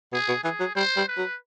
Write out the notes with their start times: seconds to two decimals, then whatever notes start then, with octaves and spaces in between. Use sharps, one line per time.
0.13 B2 G#4
0.28 B2
0.44 E3 G#4
0.60 F#3
0.75 G3 C5
0.97 G3
1.08 B4
1.18 F#3